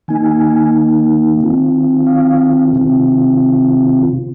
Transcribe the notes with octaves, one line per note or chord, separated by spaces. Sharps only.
D#3 A#3 D#4 G#5
D#3 C4 F4
F5
C3 D#3 C4 F4